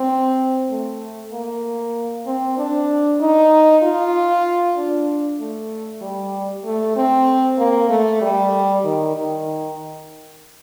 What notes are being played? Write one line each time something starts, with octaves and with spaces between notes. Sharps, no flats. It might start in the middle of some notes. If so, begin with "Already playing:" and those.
Already playing: C4
A3
A#3
C4
D4
D#4
F4
D4
A3
G3
A3
C4
A#3
A3
G3
D#3
D#3